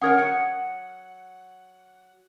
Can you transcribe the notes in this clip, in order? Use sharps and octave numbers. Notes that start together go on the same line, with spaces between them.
C#4 A#4 C#5 F#5 D#6 G#6
F#3 F#5 C#7